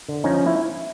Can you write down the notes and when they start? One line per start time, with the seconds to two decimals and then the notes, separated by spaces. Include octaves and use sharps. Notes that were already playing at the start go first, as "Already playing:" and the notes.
0.08 D3
0.24 F3 C#4 D#4
0.46 E4